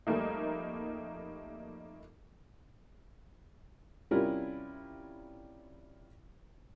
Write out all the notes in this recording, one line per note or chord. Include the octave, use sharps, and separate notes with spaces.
F2 G3 A3 A#3 D#4
C3 G3 C#4 E4 F4 A#4